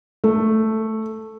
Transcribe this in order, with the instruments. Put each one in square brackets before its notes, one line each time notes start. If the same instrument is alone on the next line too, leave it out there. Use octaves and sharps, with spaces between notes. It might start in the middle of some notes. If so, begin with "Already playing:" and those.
[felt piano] A3